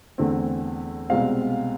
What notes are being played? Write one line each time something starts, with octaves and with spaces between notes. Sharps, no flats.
E2 D3 A3 C4
C2 B2 G#3 C4 F5